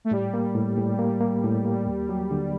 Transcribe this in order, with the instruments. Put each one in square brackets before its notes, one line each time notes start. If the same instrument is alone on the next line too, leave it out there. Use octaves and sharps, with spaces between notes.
[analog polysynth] A3
[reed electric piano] A2 [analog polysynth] G3
[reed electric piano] A#3
A2
A2
A#3
A#3
A2
A#3
D#2
F#3
D3